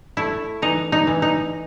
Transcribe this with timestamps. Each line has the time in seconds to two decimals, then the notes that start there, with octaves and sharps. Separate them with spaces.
0.17 A3 E4
0.62 E3 D#4
0.92 D#4
1.07 E3
1.22 D#4